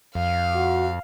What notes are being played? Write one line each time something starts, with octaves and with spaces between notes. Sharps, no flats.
F2 F5
F#4